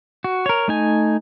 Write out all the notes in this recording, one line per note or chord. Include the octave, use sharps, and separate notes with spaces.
F#4
A#4 C#5
A3 D#4 G#5